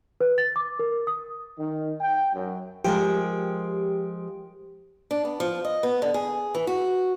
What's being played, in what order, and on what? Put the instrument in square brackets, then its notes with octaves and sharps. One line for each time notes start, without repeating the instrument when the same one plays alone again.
[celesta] B4
A6
D6
A#4
D#6
[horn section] D#3
G5
F#2
[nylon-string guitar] F3 G#3 A#4 [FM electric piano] G4
[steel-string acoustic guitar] D4
B3
F3
D#5
B3
D3
G#4
E3
F#4